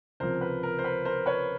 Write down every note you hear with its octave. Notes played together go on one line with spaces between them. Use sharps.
C#2 C3 F3 A#4 C5
B4
A#4
C5
B4
A#4 C5
B4 C#5